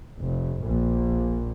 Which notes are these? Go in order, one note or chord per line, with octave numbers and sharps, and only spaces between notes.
F1
A#1